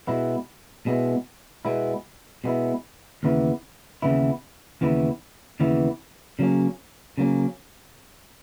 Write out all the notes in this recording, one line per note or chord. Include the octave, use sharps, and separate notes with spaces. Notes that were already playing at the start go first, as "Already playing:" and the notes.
B2 G#3 B3 E4
B2 G#3 B3 E4
B2 G#3 B3 E4
B2 G#3 B3 E4
D#2 C#3 E3 B3 E4
D#2 C#3 E3 B3 E4
D#2 C#3 E3 B3 E4
D#2 C#3 E3 B3 E4
C#3 F#3 A#3 C#4
C#3 F#3 A#3 C#4